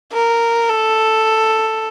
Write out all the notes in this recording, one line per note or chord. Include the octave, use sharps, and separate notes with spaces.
A#4
A4